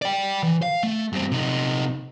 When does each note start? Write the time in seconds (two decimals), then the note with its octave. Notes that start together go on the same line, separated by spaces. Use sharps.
0.02 D5 G5
0.43 E3
0.62 F5
0.83 A3
1.13 G2 C4
1.32 C3 D#4